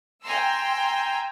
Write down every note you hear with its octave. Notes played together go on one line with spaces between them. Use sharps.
G5 G#5 A#5 C6 E6